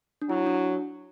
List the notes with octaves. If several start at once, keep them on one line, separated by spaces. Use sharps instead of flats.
D4
F#3 E4
D4